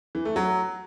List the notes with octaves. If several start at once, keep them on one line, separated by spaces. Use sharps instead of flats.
E3
A3
F#3